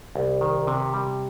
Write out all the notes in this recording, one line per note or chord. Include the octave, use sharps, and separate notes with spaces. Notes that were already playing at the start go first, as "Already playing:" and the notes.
C2
D#3
C3
G3